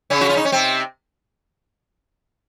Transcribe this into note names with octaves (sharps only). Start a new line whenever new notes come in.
C#3 C#4
F#4
F4
D#4
C#4
C3 C4